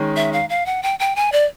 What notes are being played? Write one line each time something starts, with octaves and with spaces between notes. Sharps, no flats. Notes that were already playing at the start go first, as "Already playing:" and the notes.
Already playing: D#3 G#3 C#4
E5
F5
F5
F#5
G5
G5
G#5
D5